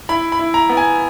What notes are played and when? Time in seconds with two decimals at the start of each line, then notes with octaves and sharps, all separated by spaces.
0.09 E4 B5
0.32 B5
0.39 E4
0.54 A#5
0.69 B3
0.77 G#5